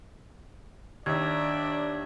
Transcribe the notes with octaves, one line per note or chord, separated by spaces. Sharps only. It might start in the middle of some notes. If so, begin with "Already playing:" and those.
D#2 D4 D5 E5 G#6